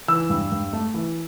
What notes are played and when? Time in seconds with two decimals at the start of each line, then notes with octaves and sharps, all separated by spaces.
0.08 E3 E6
0.30 G2
0.52 G2
0.73 A3
0.94 E3